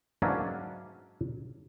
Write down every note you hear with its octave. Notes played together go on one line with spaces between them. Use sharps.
G#2 E3 F#3 A#3 C#4 D4